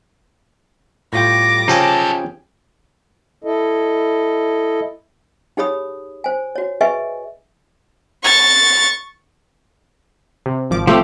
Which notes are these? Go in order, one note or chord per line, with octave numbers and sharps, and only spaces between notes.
A2 G3 F4 G5 D6 A#6
C#3 F3 C#4 D#4 G4 A4 G5 G#5
E4 A4 D#5
D#4 G4 G#4 C#5 B5 D#6
C5 G#5
F#4 C#5
G#4 B4 D#5 E5 G#5 C#6
C#6 A6
C3
G#1 F3 D6
F3 A3 C4 G4